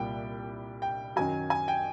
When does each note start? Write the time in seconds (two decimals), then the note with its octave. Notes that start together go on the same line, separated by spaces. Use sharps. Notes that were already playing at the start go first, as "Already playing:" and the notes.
Already playing: C2 A#2 G3 G5
0.82 G5
1.16 F#2 D#3 F#3 G#5
1.50 G#5
1.68 G5